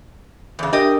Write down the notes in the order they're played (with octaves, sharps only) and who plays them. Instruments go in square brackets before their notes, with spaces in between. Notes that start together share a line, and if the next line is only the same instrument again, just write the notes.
[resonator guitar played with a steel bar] E2 C#3
[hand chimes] D4 A#4 D#6 [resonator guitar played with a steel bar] G4 D#5